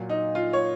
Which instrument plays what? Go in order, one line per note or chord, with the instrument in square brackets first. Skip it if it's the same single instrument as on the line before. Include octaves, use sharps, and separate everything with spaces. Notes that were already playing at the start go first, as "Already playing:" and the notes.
Already playing: [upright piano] A#2 F#3
D#4
F4
C#5